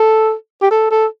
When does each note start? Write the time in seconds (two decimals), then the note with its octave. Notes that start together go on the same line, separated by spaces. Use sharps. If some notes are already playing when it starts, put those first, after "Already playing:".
Already playing: A4
0.62 G4
0.71 A4
0.91 A4